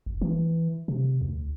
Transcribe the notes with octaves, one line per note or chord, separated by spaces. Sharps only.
F1
E3
C3
D2